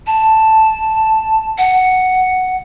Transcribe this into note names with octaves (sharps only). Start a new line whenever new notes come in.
A5
F#5